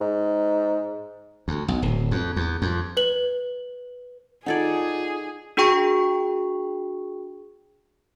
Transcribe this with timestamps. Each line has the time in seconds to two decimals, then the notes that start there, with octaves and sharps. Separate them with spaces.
0.01 G#2
1.48 D2
1.68 B1
1.82 D1
2.11 F2
2.36 E2
2.62 F2
2.97 B4 F#7
4.46 D#4 F4 G#4 A4 D5 F#5 G#6
5.57 D4 F#4 G#4 G5 C#6